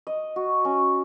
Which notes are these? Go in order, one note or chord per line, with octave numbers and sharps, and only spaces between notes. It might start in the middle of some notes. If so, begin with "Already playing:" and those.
D#5
F#4
C#4